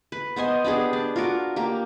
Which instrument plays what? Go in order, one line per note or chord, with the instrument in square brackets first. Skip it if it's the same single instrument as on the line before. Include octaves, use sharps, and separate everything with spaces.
[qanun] B4
B3 C5 D#5 G#5
B3 D4 G4 G#4
D4
F4 F#4 A#4 D6
A#3 G4 A#4